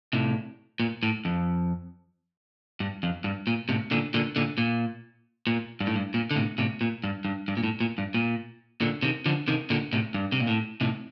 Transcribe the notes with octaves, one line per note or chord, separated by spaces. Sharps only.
A2 C3
A#2
A2
F2
G2
F2
G2
A#2
A2 C3
A#2 D3
A#2 D3
A#2 D3
A#2
A#2
G2
A2
G2
A#2
D3
A2 C3
A2 C3
A#2
G2
G2
G2
A#2
A2
A#2
G2
A#2
A#2 D3
C3 D#3
D3 F3
C3 D#3
A#2 D3
A2 C3
G2
C3
A#2
A2
A2 C3